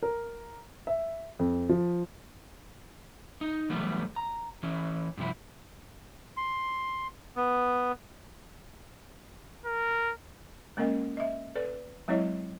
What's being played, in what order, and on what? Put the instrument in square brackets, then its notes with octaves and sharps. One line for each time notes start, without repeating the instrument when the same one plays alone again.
[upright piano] A#4
E5
F2
F3
[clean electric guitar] D#4
E3 F#3 G3 A3 B3
A#5
E3 C#4
G2 C3 F3 E4
[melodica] C6
B3
[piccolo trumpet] A#4
[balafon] G#3 A#3 C#4 A#4 D#5 F#5
D#5 E5
A4 B4 D5
F#3 G#3 C4 E4 C#5 D#5